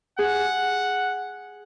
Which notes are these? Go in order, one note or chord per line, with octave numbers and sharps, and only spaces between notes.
G#4 F#5